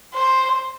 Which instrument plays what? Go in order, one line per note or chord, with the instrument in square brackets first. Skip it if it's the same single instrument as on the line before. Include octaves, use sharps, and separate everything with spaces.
[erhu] C5